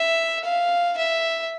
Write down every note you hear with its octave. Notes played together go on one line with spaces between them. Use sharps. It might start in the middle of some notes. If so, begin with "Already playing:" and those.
Already playing: E5
F5
E5